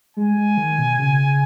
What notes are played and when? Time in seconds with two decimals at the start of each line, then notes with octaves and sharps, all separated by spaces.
0.17 G#3 G#5
0.37 G#3
0.57 D#3
0.78 B2
0.99 C#3